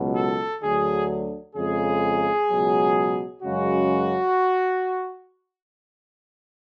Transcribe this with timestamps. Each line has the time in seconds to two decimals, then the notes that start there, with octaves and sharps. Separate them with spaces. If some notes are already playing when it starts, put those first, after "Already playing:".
Already playing: C#2 B2 F#3
0.15 A4
0.62 D2 D3 F#3 G#4
1.56 F2 C#3 G#3 G#4
2.50 C#2 B2 F#3
3.43 F#2 C#3 G#3 F#4